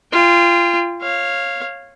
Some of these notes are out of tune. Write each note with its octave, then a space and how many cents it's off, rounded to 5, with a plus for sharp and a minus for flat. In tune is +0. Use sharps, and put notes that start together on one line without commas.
F4 -20 G5 +30
C#5 -15 F5 +0